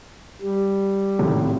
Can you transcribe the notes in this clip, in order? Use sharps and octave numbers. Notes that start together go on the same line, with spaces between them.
G3
G#1 A2 C3